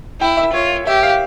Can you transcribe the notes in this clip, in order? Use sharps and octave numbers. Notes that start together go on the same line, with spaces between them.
E4 G5
E5
F4 C#5
C#5
G4 E5
F5